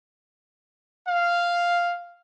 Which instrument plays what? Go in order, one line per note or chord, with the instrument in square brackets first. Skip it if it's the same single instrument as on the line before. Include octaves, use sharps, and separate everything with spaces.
[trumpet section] F5